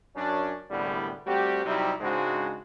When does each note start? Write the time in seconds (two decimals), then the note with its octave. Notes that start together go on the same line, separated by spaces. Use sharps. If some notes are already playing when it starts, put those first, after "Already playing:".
0.16 F#2 C#4 D4
0.70 C2 A2 D3 G3 G#3 B3
1.27 G3 A3 C4 F#4 G4
1.65 C3 F#3 G3 C4 D#4 E4
2.01 G#2 C#3 G#3 C4 D4 F#4